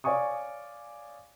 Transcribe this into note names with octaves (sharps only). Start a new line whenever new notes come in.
C#5 D5 F5 G#5 C#6 D#6